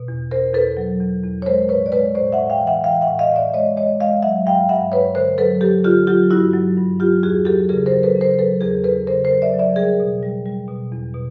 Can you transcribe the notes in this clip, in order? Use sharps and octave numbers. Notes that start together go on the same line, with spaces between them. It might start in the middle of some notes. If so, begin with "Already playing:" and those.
Already playing: B2
E2
E2 A#4 C5
E2 A4 B4
F#3
E2
E2
C#5
G#3 A#4 C5
A2 B4 C#5
D5
G#3 B4 C#5
A2 C5 D5
E5 F#5
A2
F5 G5
E3
E5 F#5
E3 F5 G5
E5 F#5
A2
D#5 F5
A2 D5 E5
G#3 C#5 D#5
G#3 C#5 D#5
G#3 D#5 F5
F#3 E5 F#5
G2 F5 G5
G2 E5 F#5
G2 B4 C#5
D3 A#4 C5
F#3 A4 B4
F#3 G4 A4
D3 F4 G4
F#3 F4 G4
G2 E4 F#4
F#3
G2
F#3 F4 G4
E2 F#4 G#4
F#3 G4 A4
C#3 G#4 A#4
A#4 C5
F#3
A4 B4
C#3
A#4 C5
F#3 A4 B4
E2 G#4 A#4
E2 A4 B4
C#3 A#4 C5
A#4 C5
F#3
D5 E5
F#3
D5 E5
G3 G#4 A#4
B2
G3
G3
B2
E2
B2